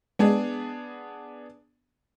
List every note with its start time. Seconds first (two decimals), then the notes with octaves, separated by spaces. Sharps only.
0.19 G#3 B3 D4 G#4